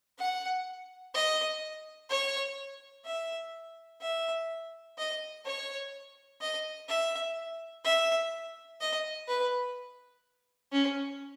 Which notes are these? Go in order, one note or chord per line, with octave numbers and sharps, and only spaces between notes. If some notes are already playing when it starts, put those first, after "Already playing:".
F#5
D#5
C#5
E5
E5
D#5
C#5
D#5
E5
E5
D#5
B4
C#4